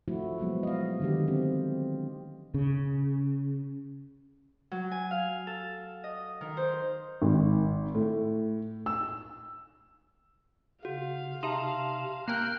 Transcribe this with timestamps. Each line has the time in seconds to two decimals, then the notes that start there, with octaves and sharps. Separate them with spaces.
0.08 F3 A3 E4 F#4
0.38 F3 F#3 G#3 B3
0.63 D#5 F5
1.00 D3 D#3 G4
1.28 C4
2.54 C#3
4.71 F#3
4.91 G#5
5.11 F5
5.47 A4
6.04 D#5
6.41 D#3
6.57 C5
7.22 G#1
7.95 A2
8.86 E6
10.85 C#3 F#4 F5
11.43 C3 D#4 E5 A5 C6
12.28 A#3 A#4 G5 F6 F#6